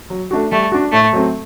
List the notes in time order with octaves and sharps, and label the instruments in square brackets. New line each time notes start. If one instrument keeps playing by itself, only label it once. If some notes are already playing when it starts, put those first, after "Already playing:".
[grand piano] F#3
A3 D4 F#4
[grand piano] G3 [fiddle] A3
[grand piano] D4 F#4
[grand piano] A2 [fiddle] A3
[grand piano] F#3 A3 C4